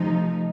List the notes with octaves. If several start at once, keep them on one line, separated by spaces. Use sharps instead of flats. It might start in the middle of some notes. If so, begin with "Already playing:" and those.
Already playing: C3 F3 A3 D#4